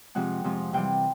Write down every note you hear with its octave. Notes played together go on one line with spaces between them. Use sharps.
F2 C3 F3 G#3 F#5
F2 C3 F3 G#3
C3 E3 G3 G5